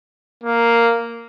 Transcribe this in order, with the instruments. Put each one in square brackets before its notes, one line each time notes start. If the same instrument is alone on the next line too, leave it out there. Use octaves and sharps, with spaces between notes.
[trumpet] A#3